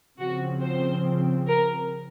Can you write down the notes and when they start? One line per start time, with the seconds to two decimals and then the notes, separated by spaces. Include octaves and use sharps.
0.19 C#3 F3 C4 F#4
0.62 C5
1.47 A#4